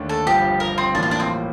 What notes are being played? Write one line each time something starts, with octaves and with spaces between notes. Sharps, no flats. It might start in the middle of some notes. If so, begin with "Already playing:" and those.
Already playing: D#2 D3 A3
A4
G1 G2 F3 G4
A#4
C4
A1 A2 F3 A#3 D4
F4
D4
C4